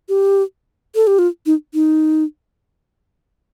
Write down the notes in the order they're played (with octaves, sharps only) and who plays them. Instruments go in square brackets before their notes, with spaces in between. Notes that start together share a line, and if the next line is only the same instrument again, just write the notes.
[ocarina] G4
A4
G4
F4
D#4
D#4